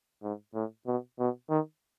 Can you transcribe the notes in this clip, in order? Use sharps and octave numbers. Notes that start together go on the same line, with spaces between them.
G#2
A2
B2
B2
D#3